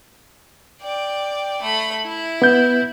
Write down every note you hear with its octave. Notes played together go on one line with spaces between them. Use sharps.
D5 G5
A3 B5
E4
B3 G6